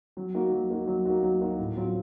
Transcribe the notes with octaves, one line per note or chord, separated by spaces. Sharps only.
F#3
A#3 D#4 F#4
F#3
A#3 D#4 F#4
F#3
A#3 D#4 F#4
F#3
A#3 D#4 F#4
A2
F#3 C4 F4